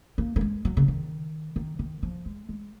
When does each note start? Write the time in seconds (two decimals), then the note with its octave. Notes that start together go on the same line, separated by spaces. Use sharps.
0.18 A#3
0.36 A#3
0.41 G#3
0.65 F#3
0.77 C#3
0.88 D#3
1.56 D#3
1.79 D#3
2.03 F3
2.26 G#3
2.49 G#3